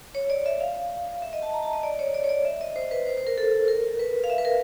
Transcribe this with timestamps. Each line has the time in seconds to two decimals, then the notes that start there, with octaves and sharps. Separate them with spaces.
0.15 C#5
0.30 D5
0.46 E5
0.61 F5
1.22 E5
1.33 D#5
1.42 A5
1.53 A#5
1.62 A5
1.73 D#5
1.83 D5
1.99 C#5
2.14 D5
2.24 C#5
2.29 D5
2.45 E5
2.61 D#5
2.76 C5
2.91 B4
3.06 C5
3.17 C5
3.27 A#4
3.38 A4
3.68 A#4
3.99 B4
4.24 F5
4.30 E5
4.38 B4
4.45 A#4